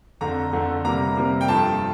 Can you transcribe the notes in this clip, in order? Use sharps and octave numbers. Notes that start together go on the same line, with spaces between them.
F2 D3 A3 A#5
F2 D3 A3
C3 G3 A#3 A#5
C3 G3 A#3
G5
G2 F3 A3 A5